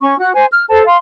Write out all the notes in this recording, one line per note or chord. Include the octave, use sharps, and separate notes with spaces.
C#4 C#6
F#4 F#6
C5 G#5
F6
A4 C5 A5
F5 C6